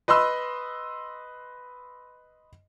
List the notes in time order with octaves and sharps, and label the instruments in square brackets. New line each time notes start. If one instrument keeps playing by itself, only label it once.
[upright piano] B4 D#5 B5 C6 E6